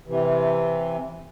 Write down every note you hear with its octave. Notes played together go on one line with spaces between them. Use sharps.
C3 E3